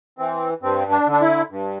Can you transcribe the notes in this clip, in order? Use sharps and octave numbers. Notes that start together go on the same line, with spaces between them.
E3 C4
G2 C4
D4
D3 D4
E4
G2